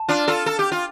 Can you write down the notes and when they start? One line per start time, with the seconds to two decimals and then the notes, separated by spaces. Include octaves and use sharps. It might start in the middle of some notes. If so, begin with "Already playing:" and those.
Already playing: A5
0.09 D4 F4
0.28 F4 A4
0.46 A4
0.59 G4
0.72 F4